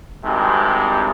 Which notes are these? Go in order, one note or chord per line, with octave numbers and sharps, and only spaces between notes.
G#1 G2 C3 G#3